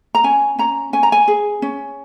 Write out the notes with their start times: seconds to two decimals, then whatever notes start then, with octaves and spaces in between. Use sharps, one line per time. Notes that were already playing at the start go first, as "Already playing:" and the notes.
0.15 A#5
0.24 C#4 G#5
0.59 C#4 A#5
0.93 C#4 G#5
1.03 A#5
1.12 G#5
1.28 G#4
1.62 C#4